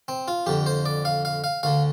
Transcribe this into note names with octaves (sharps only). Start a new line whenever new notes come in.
C4
F4
F2 D3 G4
C5
D5
F5
F5
F5
D2 D3 F5